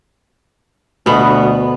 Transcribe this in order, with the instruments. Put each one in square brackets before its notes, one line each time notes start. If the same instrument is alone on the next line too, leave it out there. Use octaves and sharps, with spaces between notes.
[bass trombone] D2 [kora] B2 B3